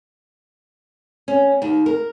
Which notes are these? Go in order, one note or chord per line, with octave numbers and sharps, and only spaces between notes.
C#4
D#2
A#4